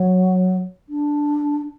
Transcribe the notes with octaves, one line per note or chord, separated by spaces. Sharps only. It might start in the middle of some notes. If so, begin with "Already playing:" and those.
Already playing: F#3
D4